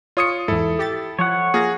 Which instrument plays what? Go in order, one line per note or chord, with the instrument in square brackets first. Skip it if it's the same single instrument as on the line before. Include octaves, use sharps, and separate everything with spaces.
[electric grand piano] F4 D#6 C#7 [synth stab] C#5
[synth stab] E2 G#2 [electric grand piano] E4 A4
[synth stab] G4 A6
[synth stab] F3 [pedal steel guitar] C#5 F#5
[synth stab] A#3 F4 A#6 [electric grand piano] G#4